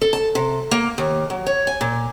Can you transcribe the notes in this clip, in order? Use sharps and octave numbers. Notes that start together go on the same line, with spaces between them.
A4
A5
C3
A#3
D#2
F#3
C#5
G#5
A#2